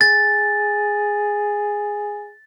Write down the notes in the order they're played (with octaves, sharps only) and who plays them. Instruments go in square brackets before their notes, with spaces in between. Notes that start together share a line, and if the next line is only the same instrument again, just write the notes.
[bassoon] G#4 [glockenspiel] A6